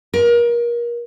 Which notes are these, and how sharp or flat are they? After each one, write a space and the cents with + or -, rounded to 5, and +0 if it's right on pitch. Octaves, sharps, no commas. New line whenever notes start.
A#4 +30